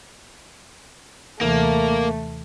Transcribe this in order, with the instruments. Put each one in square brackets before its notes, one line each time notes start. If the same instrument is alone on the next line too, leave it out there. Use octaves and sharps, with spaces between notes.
[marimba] D#2 C3 E3 [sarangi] A3 [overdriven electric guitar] A#3